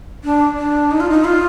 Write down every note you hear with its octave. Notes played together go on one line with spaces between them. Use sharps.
D4
D4
D#4
F4
D#4
F4